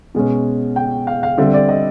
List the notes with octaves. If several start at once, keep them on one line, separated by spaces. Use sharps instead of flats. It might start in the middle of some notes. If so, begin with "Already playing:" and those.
B2 G#3 C#4
G5
F5
F5
D3 G3 C4 E5
D5
D#5